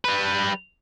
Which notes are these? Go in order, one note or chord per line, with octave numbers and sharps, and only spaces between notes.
G3 B4